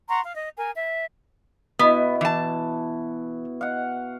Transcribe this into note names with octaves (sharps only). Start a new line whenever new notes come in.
F#5 A#5 C6 C#6
F5
D#5
A#4 G#5
E5
B2 B3 E4
E3 A5
F5 F#5